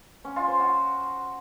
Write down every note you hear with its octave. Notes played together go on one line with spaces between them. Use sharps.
C#4
F4
C5
F#4